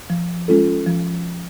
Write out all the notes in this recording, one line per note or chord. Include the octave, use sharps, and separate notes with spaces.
F3
G#3 C#4 F4 A4
F3